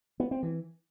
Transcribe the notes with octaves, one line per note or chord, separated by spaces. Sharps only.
B3
C4
E3